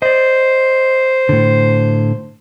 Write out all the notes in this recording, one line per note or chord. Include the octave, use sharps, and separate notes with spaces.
C5 D5 D#5
A2 D3